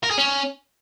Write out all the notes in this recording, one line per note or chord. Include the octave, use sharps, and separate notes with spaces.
A#4
G#4
C#4